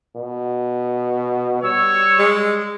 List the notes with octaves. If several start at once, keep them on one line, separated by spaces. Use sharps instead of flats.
B2
G3 C#5 E6
G#3